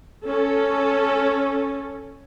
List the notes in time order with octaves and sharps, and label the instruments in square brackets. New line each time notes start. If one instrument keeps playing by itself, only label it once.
[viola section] C#4 A4